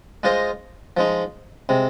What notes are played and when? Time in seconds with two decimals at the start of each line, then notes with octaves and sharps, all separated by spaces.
0.23 G#3 F4 C5 D#5
0.97 F3 G#3 D#4
1.69 C3 G#3